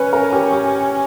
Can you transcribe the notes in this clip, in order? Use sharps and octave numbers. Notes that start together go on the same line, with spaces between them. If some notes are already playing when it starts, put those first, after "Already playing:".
Already playing: C#4 B4
A#4
G4
G4